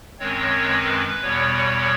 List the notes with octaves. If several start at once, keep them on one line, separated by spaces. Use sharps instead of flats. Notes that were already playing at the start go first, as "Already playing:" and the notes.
F#2 D#3 G#3 C4 C#5
B4
E2 B2 G3 B3 C#5